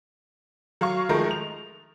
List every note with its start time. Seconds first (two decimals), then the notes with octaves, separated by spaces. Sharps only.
0.81 F#3 F5 C#6
1.09 D#3 F3 G#3 A3 A#4
1.31 F7